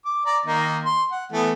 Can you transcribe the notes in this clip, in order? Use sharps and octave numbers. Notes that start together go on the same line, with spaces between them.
D6
D5 A#5
D#3 A#3 D#4
C6
F#5
E3 A3 B3